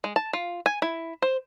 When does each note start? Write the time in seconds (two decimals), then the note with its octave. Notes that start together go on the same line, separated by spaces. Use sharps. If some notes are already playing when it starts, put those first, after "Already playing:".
0.04 G#3
0.16 A5
0.33 F4
0.66 G#5
0.82 E4
1.22 C5